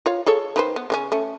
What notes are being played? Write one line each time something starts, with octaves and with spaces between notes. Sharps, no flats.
F4 C#5 F5
G#4 A4 C#5
D#3 B4 C5
B3
C#3 C4 C#4
A3 C#4